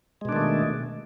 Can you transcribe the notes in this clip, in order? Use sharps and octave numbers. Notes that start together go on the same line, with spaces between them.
B2 D#3 G#3 A3 D4